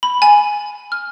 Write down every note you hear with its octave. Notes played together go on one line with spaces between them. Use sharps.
B5
G#5
F6